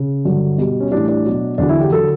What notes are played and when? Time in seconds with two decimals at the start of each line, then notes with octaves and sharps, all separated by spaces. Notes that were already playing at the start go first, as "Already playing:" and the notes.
Already playing: C#3
0.25 G2 D3 F#3
0.58 B2 G3
0.80 C#4
0.91 A2 E3 G3 D4
1.09 D4
1.24 B2 F#3
1.58 E2 D3 F#3 D4
1.69 E4
1.80 G4
1.92 D3 F#3 A4